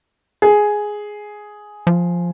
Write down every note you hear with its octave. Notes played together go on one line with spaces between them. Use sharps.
G#4
F3